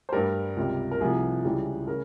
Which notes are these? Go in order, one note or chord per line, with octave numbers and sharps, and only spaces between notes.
C5
G2 G3 A#4
C#2 C3 G3
A#4
C2 C3 F3 G#4
C#2 C#3 E3 G3
C#3 A#4